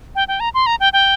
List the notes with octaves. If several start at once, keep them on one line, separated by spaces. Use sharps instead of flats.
G5
G5
A#5
C6
A#5
G5
G5